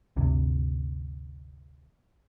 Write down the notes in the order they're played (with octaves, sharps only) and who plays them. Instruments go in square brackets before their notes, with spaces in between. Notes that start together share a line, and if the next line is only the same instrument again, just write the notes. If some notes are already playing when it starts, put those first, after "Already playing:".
[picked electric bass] G1 D2 C3